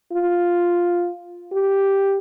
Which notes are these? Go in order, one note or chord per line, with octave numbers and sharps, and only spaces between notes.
F4
G4